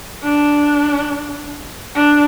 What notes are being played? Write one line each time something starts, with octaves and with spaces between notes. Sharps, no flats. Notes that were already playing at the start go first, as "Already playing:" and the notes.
D4
D4